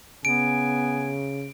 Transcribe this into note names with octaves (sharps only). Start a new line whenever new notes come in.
C#3 B3 G#5 D7